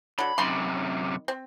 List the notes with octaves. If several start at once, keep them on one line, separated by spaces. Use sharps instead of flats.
D3 F#3 B5
F#2 C3 D#3 B5 C6
C4